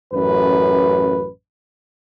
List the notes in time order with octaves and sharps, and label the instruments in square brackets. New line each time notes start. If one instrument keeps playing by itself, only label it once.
[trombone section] A1 F#2 B4